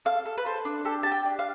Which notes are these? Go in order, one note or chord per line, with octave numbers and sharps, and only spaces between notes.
A4 F5
A4
B4
A4 C5
D4
G4 A4
G4 A5
G5
D4
F5